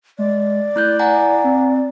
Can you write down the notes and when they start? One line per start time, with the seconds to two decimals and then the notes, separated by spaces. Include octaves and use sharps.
0.18 G#3 D5
0.76 A3 E4 F#6 G6
0.99 F#5 G#5 A#5
1.44 C4